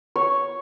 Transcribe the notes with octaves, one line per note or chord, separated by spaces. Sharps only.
C#5